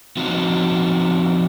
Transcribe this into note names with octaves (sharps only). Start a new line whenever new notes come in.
F3 C4 D#4 F#4